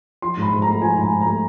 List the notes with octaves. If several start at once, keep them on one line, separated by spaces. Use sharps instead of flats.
F3 C6
G#2
B5
G#2
A3 A#5
F3 G#5
G#2 G#5
G#2
A#5
A3